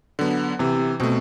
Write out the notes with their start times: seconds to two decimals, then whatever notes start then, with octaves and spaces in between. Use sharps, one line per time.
0.19 D3 F#3 B3
0.59 C3 E3
1.00 B2 A3 C4